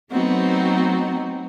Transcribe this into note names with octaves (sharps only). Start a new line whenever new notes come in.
F#3 A3 B3 C4 D#4 F#4